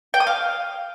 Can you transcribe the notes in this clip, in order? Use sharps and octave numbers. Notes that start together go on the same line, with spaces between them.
G5
D#6
F5